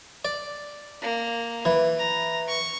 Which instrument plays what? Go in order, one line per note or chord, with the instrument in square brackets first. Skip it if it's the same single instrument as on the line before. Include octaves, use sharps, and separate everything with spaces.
[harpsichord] D5
[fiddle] A#3
[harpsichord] E3
[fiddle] A#5
C#6